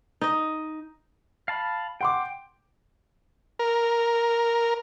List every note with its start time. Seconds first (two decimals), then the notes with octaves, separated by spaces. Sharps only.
0.21 D#4 D#5
1.48 F5 A5 B5
2.01 F#5 G5 C6 D6
3.59 A#4